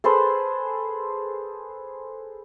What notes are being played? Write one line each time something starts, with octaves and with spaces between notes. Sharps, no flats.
G#4 A4 B4 C5